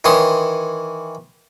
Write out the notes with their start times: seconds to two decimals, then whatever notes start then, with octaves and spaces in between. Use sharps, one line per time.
0.04 D#3 E3 C#5 C6 D#6